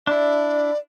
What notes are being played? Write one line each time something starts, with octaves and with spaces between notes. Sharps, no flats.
D4 E4 D5